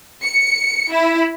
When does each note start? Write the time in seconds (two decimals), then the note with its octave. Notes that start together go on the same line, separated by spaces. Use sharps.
0.23 C#7
0.91 E4